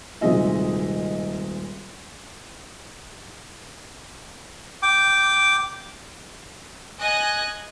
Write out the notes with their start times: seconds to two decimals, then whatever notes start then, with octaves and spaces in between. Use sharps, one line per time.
0.21 D#1 C3 F#3 G#3 D#5 E5
4.83 G5 D6
6.99 D#5 G#5 F#6 A#6